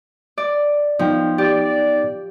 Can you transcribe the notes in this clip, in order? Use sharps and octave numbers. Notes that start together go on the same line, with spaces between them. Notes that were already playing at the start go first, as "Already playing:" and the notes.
D5
F3 B3 D#4 G5
G4 D5